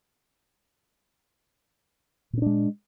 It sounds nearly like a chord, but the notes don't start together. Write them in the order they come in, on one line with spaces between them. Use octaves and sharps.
A#2 C#4 D4 G#3